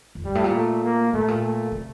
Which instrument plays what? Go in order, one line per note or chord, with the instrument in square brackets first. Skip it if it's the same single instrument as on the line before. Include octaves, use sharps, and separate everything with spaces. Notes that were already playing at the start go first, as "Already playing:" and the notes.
[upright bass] F2
[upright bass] G2 [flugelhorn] G3
[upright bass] A2
A#2
[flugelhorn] A3
A#3
[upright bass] A2 [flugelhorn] A3
[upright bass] A#2
[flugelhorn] A3
[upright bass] C3